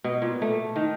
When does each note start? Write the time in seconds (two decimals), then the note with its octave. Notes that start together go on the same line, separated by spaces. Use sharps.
0.04 B2
0.22 A#2
0.42 A3
0.76 D#3